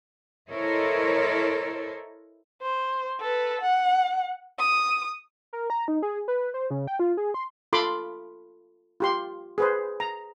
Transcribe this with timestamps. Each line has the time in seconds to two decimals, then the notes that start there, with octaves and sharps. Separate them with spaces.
0.50 E4 A4 A#4 C5 C#5 D#5
2.62 C5
3.20 A4 B4
3.62 F#5
4.59 D#6
5.53 A#4
5.70 A#5
5.88 D#4
6.02 G#4
6.28 B4
6.54 C5
6.70 C#3
6.87 G5
6.99 F4
7.17 G#4
7.34 C6
7.73 F4 A4 B5 C6 D6
9.00 F4 G4 C6
9.58 G#4 B4 C5
10.00 A#5